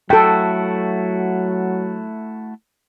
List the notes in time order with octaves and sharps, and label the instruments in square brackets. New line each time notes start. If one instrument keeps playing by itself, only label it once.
[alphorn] F#3 [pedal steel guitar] A3 E4 F#4 [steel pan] A4 G5